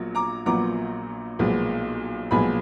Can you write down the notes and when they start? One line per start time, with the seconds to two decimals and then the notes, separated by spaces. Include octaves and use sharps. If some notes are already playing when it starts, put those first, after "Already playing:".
Already playing: A#1 A#2 F#3 B3
0.15 A#5 D6
0.46 A#1 A#2 F#3 B3 A#5 D6
1.39 B1 A#2 F3 G#3 B3
2.31 B1 A#2 F3 G#3 B3 G#5 B5